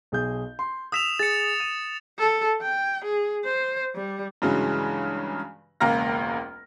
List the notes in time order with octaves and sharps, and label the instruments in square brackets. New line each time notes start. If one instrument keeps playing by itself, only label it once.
[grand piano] B1 G#4 G6
C6
[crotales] D#6 E7 F7 [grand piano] E6 B6
[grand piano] G#4 [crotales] A6 C#7
[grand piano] D#7
[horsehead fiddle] A4
G5
G#4
C5
G3
[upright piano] G2 C#3 E3 F#3 G#3
E1 C#2 A#3 A#5 F6 A#6